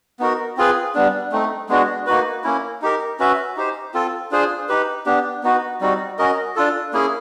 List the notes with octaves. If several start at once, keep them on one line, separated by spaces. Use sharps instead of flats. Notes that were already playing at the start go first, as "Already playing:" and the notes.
B3 D#4 F#4 A#4
C4 F4 G#4 B4
G3 B3 D4
A3 C4 D#4
G#3 B3 D4 F#4
A#3 D#4 F#4 B4
A#3 C#4 E4
D#4 G4 A#4
C#4 F#4 B4 E5
D#4 G4 C5
C4 F4 A4
D4 F4 G#4 C5
D#4 G4 B4
B3 D4 G4
B3 D#4 F#4 B4
G3 C4 D#4 F#4
C#4 F#4 A#4 D#5
D4 F4 A4
A#3 C#4 E4 G#4